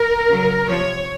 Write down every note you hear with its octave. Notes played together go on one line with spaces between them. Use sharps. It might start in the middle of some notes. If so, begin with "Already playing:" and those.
Already playing: A#4
C#3 F#3
C3 F3 C#5